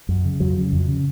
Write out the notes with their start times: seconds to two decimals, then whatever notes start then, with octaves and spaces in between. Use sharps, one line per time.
0.09 F#2
0.25 C#3
0.40 F2 F#3
0.57 C#3
0.72 F2
0.88 C#3